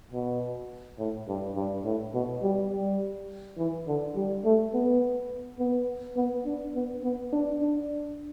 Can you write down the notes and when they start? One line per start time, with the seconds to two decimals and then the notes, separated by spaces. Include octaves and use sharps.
0.12 B2
0.98 A2
1.28 G2
1.55 G2
1.85 A2
2.14 B2
2.42 G3
2.71 G3
3.57 E3
3.87 D3
4.16 G3
4.45 A3
4.73 B3
5.59 B3
6.16 B3
6.45 D4
6.75 B3
7.03 B3
7.33 D4
7.61 D4